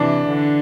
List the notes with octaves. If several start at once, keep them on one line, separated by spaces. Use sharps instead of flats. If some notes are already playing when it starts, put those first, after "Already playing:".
Already playing: C3 E3 D4
D3